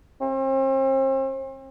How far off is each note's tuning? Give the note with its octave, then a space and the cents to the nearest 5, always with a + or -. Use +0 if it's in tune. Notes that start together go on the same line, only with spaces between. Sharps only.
C4 +40